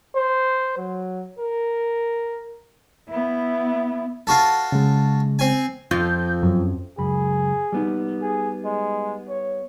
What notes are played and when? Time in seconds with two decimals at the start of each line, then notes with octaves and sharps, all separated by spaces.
0.16 C5
0.78 F#3
1.39 A#4
3.10 B3 E4
4.27 F4 F#4 A4
4.72 C#3 G#3
5.39 C4 G#5
5.91 F2 F4 G6
6.43 F#2
6.98 C#2 F#2 G#4 B5
7.72 G3 B3 D#4
8.22 G#4
8.65 G#3
9.29 C#5